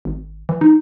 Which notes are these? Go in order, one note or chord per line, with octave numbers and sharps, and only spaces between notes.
G#1
E3
D#4